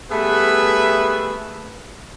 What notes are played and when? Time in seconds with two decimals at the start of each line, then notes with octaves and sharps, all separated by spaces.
0.11 G3 A3 B3 G#4 B4 E5